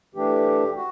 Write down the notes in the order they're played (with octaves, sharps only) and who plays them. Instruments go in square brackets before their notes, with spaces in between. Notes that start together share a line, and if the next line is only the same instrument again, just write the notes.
[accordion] E3 A3 D4 G4
F#4